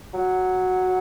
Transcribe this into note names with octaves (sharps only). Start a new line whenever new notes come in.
F#3